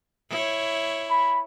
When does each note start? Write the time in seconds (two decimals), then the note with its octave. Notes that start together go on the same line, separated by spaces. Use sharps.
0.30 E4 C#5
1.10 B5